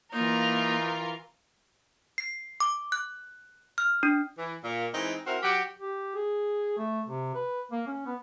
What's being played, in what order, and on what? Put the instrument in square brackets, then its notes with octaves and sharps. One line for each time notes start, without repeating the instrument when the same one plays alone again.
[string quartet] E3 F4 A#4 [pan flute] A#3 [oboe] D#4
[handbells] C7
D6
F#6
F6
D4
[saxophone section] E3
A#2
E3 G#3 C4 D#4
C4 E4 F#4 A#4 C5
F#3 F#4 G4
[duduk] G4
G#4
A3
C3
B4
A#3
C#4
B3